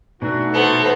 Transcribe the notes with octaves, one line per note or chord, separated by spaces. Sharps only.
B2 E3 A3 D4 D#4 F#4
B3 A4 B4 C5